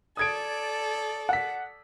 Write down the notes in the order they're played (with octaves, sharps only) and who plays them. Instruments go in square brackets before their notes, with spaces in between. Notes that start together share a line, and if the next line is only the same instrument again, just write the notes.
[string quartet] A4 D5 [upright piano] D#6 G#6 D7
[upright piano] F#5 B6